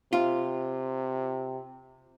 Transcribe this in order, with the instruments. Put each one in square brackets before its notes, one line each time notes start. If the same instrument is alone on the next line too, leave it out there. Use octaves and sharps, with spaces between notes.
[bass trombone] C3 [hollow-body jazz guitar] F4